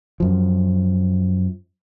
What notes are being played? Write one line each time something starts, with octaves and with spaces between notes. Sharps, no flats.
F#2 F3